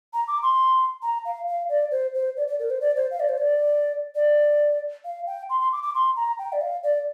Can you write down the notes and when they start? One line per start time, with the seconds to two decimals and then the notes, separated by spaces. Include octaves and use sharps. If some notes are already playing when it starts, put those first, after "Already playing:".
0.14 A#5
0.28 D6
0.43 C6
1.02 A#5
1.25 F5
1.47 F5
1.69 D5
1.91 C5
2.14 C5
2.37 D5
2.48 D5
2.59 A#4
2.70 C5
2.81 D5
2.96 C5
3.11 F5
3.20 D5
3.29 C5
3.38 D5
4.15 D5
5.05 F5
5.27 G5
5.50 C6
5.60 C6
5.72 D6
5.83 D6
5.95 C6
6.16 A#5
6.39 G5
6.53 D5
6.61 F5
6.83 D5